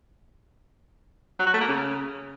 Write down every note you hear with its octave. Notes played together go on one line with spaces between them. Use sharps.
F#3
F#4
A3
A#3
C#3